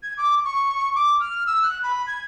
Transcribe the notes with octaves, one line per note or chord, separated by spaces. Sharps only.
G#6
D6
C#6
D6
F6
E6
F#6
B5
G#6